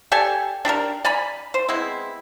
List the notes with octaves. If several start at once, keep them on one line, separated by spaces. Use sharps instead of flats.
G4 A4 D5 G#5
D4 G4 A4 A#4
D5 G#5 A#5 B5
C5
G#3 B3 C4 E4